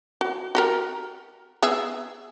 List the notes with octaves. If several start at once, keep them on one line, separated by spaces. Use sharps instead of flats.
F#4
F#4 G4 A#4
B3 G#4 E5